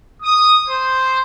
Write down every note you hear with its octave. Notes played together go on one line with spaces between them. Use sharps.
D#6
C5